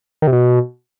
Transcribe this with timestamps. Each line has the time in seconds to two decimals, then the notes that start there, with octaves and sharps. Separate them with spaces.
0.22 D#3
0.27 C3
0.32 B2